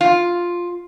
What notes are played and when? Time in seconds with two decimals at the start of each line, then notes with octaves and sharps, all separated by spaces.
0.01 F4